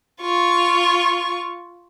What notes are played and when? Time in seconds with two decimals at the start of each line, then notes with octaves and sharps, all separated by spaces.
0.21 F4 C#6